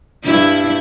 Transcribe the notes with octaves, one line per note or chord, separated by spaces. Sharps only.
G2 E4